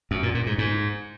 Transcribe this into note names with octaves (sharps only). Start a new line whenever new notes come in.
F#2
A#2
A#2
G#2
G#2